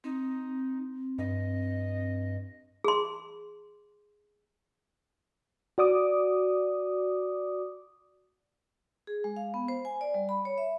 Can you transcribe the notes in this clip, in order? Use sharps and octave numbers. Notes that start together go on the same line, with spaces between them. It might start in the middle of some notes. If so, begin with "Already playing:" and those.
C4 D#4
G2 D#5
G#4 C6
F#4 D5 D6 D#6
G#4
G#3
F5
B3
C5
G#5
D5
G3
B5
C#5
E5